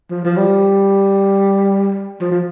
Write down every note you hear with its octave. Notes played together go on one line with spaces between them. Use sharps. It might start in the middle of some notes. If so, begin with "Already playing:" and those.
F3
F3
G3
F3
F3